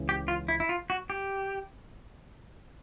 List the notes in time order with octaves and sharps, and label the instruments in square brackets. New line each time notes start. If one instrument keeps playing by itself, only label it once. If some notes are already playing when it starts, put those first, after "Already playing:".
Already playing: [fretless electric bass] C#2 C#3 E3
[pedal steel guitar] G4
F4
E4
E4
F4
F#4
G4